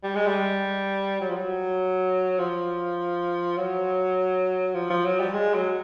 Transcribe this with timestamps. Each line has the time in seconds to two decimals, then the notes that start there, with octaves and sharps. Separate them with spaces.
0.03 G3
0.15 G#3
0.26 G3
1.21 F#3
1.29 F3
1.37 F#3
2.39 F3
3.57 F#3
4.74 F3
4.90 F3
5.05 F#3
5.20 G3
5.33 G#3
5.54 F#3